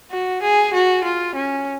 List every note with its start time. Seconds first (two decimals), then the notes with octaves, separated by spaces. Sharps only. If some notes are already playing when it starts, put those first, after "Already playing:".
0.11 F#4
0.42 G#4
0.74 F#4
1.04 F4
1.35 C#4